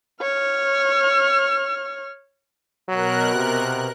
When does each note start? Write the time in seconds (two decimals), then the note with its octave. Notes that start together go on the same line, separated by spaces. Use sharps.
0.21 C#5 F6
2.88 B2 F#3 A#4 F#6
3.34 C3